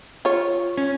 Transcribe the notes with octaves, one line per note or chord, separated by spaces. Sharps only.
F4 C#5
C#4